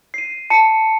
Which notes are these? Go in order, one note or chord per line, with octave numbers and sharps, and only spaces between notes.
C7 D#7
A5 C#7